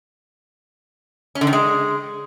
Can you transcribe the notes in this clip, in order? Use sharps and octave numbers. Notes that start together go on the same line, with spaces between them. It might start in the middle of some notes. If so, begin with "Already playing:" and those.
C#4
D3
D#3
G#3